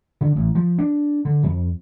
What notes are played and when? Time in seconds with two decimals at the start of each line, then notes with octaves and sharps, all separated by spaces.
0.21 D3
0.36 A1
0.55 F3
0.79 D4
1.25 D3
1.43 F2